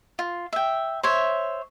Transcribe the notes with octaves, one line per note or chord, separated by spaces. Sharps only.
F4
E5 G5
C5 C#5 E5